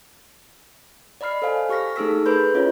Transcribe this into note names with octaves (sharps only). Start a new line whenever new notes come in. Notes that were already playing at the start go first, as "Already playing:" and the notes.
D5 D#5 B5 F6 C7
A4 C5 F5 G#5
G4 C#6 F6 A#6 B6
A3 D#4 G#4 A4 E6 B6
G#4 A#4 B4 B5 C6 G6
C#4 E4 F4 C#5 D#5